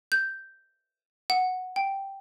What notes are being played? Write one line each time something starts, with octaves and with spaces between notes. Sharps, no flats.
G6
F#5
G5